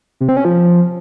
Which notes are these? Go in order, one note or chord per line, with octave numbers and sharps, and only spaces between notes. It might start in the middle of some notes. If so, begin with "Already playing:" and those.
C3
C4
C#4
F3